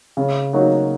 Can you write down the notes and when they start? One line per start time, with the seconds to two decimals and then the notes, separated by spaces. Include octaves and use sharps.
0.17 C#3
0.53 F#3 A#3 D#4 F#4